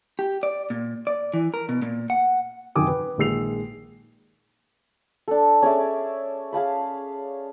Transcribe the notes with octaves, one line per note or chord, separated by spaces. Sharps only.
G4
D5
A#2
D5
E3
A#4
B2
A#2
F#5
F#2 C3 D#3 G#5 D6 D#6
B4
A#1 D#3 G#3 E6 C7 F7
D4 A4
C#4 G#4 D5 E5
G#4 F5 A5 B5